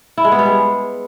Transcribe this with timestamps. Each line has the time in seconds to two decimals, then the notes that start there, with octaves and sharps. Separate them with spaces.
0.18 E4
0.25 G#3
0.32 B3
0.39 G3
0.46 G#3